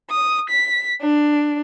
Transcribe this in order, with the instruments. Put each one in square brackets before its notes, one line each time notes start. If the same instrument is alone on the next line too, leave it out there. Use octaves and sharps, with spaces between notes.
[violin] D#6
B6
D4